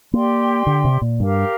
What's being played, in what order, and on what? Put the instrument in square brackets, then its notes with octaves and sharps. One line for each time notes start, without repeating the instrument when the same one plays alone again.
[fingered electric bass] A#3 [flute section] G4 D5 G5 C6
[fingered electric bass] D3
C3
A#2
[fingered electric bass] G2 [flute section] G4 A#4 F5